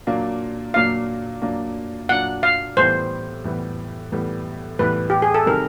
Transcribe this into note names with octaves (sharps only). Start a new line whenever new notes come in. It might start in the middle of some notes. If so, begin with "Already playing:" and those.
A#2 F#3 A#3 D4 F4
A#2 F#3 A#3 D4 F4 F5
A#2 F#3 A#3 D4 F4
A#2 F#3 A#3 D4 F4 F#5
F5
A2 E3 G3 B3 C5
A2 E3 G3 B3
A2 E3 G3 B3
A2 E3 G3 B3 B4
G4
G#4
A4
C3 D#3 G3 A#4